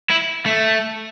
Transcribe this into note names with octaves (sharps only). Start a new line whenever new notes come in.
E4
A3